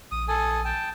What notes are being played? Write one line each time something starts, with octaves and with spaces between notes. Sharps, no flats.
A#1 D#6
A4 G#5 D#6
G5 A5